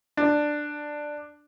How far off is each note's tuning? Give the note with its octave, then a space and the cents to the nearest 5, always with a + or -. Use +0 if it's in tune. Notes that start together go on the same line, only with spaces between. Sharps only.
D4 +10